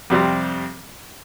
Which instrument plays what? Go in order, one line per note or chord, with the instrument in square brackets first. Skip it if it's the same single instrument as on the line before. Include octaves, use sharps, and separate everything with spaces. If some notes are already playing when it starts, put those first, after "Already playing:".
[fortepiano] F2 C3 G3 C4